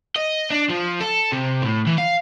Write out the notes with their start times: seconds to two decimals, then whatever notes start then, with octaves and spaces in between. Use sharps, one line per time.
0.16 D#5
0.50 D4
0.69 F3
1.00 A4
1.32 C3
1.62 A2
1.87 E3
1.98 F5